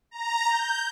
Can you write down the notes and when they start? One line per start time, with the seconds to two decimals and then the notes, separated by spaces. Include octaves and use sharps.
0.11 A#5
0.49 G6